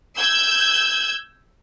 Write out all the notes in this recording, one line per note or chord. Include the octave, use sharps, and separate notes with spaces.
E6 G6 G#6